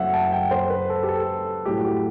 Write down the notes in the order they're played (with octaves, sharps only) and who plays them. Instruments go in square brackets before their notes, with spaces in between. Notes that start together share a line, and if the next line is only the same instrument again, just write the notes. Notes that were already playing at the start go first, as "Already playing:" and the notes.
Already playing: [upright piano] F#1 F#2 F#3 A3 C4 [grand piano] E5 F#5
[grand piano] A5
G5
C5
B4
A4
G4
A4
[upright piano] A2 F#3 A3 [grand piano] G4
[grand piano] G4